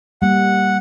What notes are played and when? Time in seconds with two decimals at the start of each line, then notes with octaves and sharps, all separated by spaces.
0.22 G3 A#3 F#5